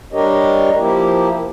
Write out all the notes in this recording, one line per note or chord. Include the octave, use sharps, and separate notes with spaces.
G3 D4 G4 A#4 C#5 D#5
F3 A#3 E4 G4